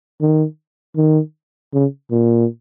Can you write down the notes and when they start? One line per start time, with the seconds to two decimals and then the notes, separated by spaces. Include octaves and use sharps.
0.21 D#3
0.96 D#3
1.74 C#3
2.11 A#2